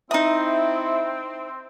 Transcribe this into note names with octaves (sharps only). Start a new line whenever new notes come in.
C4 D#4 E4 E5 A#5 D#6